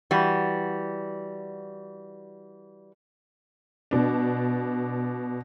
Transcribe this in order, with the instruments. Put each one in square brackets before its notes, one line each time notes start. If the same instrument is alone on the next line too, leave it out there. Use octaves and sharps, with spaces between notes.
[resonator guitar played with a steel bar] E3 G3 F#4
[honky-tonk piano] B2 D4